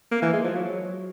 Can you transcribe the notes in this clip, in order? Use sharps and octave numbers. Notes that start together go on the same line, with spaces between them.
A#3
E3
G#3
F3
F#3